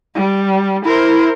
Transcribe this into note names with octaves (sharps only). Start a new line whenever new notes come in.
G3
E4 A#4 C5